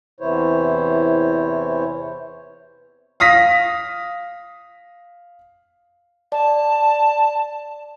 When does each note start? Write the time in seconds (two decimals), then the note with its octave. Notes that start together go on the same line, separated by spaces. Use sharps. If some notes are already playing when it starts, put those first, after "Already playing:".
0.20 E2 C3 E3 E4 C5 C#5
3.20 F5 D#6 A#6 B6
6.32 D5 A5